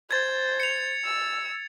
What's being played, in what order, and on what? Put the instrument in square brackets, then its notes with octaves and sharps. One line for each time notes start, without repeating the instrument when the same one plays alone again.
[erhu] C5 [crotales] G#6 A6
[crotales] C#7 F7
[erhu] E6